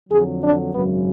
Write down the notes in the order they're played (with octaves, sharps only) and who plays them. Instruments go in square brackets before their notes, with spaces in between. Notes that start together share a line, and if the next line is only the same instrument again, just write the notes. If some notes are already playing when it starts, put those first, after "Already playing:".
[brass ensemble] F2 D3 F#3 G#4
D4
G#1 F#2 C#3 F#3 B3